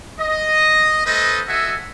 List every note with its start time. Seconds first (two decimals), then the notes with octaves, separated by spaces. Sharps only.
0.19 D#5
1.05 A3 A4 B4 C5 D#5
1.47 F#4 A4 D#5 E5 F#5 G#5